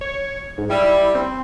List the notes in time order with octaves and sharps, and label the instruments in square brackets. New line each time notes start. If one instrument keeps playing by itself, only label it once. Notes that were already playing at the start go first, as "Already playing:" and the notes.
[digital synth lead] C#5
G#2
[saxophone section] G3 [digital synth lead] E4
[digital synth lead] C4